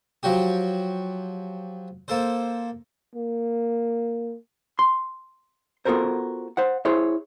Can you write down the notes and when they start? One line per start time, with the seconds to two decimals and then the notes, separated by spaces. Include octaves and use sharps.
0.23 F3 F#3 F#4 G4
2.08 A#3 A4 C5
3.15 A#3
4.79 C6
5.85 B3 F4 F#4 A4 A#4 C5
6.57 C5 F#5
6.85 E4 G#4 C5 C#5